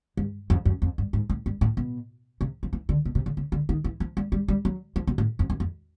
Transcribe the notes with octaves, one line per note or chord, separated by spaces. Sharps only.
G2
F2
F#2
F2
G2
G#2
A2
G2
A2
B2
C3
F3
E3
D3
B2
C3
C#3
C#3
D3
D#3
E3
F3
G3
G3
G3
F#3
F3
B2
A2
F2
F#2
F2